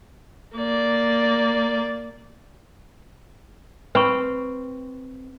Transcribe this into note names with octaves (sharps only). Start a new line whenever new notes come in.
A#3 D5
C4 B4 B5 C#6